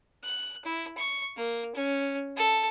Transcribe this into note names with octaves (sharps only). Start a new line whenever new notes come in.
F#6
E4
C#6
A#3
C#4
A4